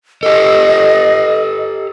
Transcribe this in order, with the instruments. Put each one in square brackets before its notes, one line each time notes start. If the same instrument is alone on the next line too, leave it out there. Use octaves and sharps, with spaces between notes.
[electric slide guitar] G4 A4 [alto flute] D#5